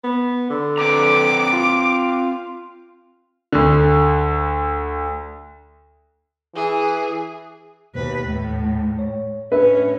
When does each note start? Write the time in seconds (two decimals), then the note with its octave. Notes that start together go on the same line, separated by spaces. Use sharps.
0.04 B3
0.50 D3
0.78 C4 B4 A#5 D6
1.53 F4
3.52 D2 D3
6.56 E3 G#4
7.95 D#2 B2 B4
8.26 D#2 A2
8.99 C#5
9.52 A2 C#4 D4 B4 E5